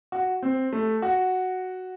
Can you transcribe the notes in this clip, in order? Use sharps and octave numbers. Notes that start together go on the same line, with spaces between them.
F#4
C4
A3
F#4